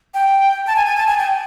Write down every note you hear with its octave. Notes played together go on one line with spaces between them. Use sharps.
G5
A5
G#5
G#5
A5
G#5
G5